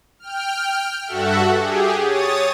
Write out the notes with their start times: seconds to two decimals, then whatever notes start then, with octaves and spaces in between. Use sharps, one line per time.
0.19 G5 F6
1.06 G2 F#4 A4 E5 F#5
1.57 G4 G#4
2.03 C#5 D#6 A6